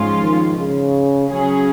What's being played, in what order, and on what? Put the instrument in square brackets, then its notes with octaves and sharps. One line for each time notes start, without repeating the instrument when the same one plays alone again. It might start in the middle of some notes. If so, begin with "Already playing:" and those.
Already playing: [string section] G#2 F3 G#3 C#4 F4
[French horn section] D#3
C#3
[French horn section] C#3 [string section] F#3 C#4 G#4